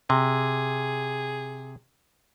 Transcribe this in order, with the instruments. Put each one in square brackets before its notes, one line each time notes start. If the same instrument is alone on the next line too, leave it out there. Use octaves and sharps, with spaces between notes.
[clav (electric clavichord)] C3 [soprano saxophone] G#4